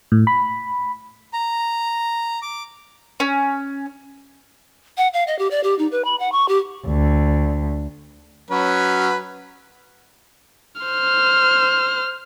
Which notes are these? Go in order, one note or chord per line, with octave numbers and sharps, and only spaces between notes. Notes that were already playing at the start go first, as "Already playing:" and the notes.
A2
B5
A#5
D6
C#4
F#5
F5
D#5
G4
D5
G4
D#4
B4
B5
F#5
C#6
G4
D2
F#3 C#4 B4
C5 F6